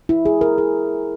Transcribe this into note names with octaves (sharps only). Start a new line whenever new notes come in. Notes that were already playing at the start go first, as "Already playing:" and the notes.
E4
G#4
A#4
G#4